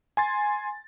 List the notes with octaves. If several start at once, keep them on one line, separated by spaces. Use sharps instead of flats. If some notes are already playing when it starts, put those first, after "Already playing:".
G#5 C6 A6